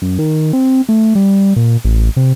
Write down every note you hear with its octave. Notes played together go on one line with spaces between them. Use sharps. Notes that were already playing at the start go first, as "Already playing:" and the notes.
F#2
D#3
C4
A3
G3
A#2
A1
C3